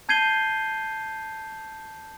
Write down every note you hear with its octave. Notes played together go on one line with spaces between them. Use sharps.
A5 G6 G#6 C7 D#7 G7